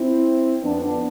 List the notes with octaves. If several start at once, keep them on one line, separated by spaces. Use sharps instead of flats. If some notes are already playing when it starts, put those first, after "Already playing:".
Already playing: C4 E4
F2 D3 B3 D4